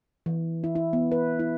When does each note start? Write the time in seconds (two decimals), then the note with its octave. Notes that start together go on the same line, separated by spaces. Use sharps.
0.26 E3
0.64 E4
0.76 E4
0.93 B3
1.12 B4
1.39 E4